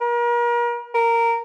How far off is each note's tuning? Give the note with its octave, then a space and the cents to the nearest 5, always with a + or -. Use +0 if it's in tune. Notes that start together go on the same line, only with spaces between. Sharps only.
A#4 +40
A#4 -10